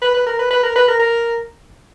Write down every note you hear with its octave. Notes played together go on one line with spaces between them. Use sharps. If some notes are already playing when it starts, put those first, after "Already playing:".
B4
B4
A#4
B4
B4
A#4
B4
A#4
A#4